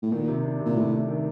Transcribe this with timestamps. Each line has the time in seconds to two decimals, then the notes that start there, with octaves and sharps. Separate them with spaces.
0.02 A2
0.12 A#2 D#3
0.28 C3
0.43 D4
0.60 C3
0.66 A#2
0.76 A2 C3
0.92 A3
1.09 D#3